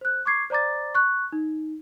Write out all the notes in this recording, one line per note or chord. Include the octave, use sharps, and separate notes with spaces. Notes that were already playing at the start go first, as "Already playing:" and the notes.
C5 F#6
C#6 D6 G#6 C7
C5 D5 A#5 D6 A6
C#6 F#6
D#4